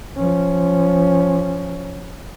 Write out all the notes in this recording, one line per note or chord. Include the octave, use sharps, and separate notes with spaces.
F3 C#4